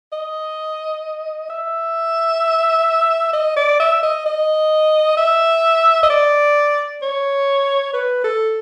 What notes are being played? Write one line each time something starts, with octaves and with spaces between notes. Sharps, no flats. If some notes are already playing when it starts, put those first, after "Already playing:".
D#5
E5
D#5
D5
E5
D#5
D#5
E5
D#5
D5
C#5
B4
A4